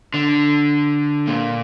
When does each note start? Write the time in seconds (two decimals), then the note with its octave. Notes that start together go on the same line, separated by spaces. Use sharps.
0.14 D3
1.27 A#2